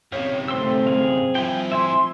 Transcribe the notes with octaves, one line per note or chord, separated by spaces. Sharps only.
F#2 C3 C#5 F5
A3 C4 C6 E6
G#4 F5
F3 E4 G5 G#5
E5 G#5 C6 E6